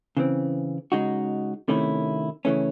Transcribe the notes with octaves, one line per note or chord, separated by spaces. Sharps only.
C#3 E3 C4
C#3 G#3 D#4 F#4
C3 D#3 A3 C#4 E4
C#3 E3 A3 C#4